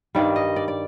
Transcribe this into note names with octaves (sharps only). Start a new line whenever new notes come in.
G2 D#3 G3 D5
D#5
D5
D5